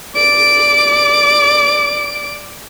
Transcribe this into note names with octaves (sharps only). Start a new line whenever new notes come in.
D5 D7